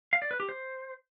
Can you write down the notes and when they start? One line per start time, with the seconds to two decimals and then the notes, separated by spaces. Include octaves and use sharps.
0.13 F5
0.22 D5
0.31 B4
0.40 G4
0.49 C5